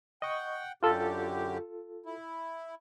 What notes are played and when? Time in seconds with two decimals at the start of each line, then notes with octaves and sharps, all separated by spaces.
0.22 D#5 F#5 G5 C#6
0.83 F#2 D3 F4 G4 A4
2.06 E4